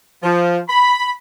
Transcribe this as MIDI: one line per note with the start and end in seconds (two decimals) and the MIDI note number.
0.23 0.59 53
0.68 1.11 83